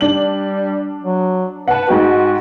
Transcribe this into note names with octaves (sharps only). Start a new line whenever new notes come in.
G3 D4 F#7
F#3
B4 F#5 A5
G#2 G#3 F#4 G5